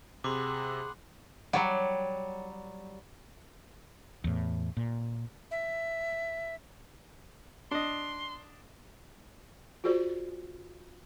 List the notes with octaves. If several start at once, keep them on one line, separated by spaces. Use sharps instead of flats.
C3 G#4 F#5 B5 C6 D6
F#3 G3 C#5 F#5
E2 A2
A#2
E5
D4 D#5 C6
F4 F#4 G#4 C5 D5